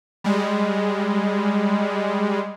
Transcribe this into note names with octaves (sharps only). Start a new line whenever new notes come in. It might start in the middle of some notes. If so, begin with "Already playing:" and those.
G3 G#3